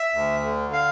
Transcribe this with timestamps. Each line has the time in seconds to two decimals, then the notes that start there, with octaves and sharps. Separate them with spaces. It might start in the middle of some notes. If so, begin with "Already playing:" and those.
Already playing: E5
0.13 D2
0.43 D3
0.73 F5